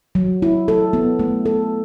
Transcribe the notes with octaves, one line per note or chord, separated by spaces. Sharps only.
F#3
E4
A4
B3
A3
A4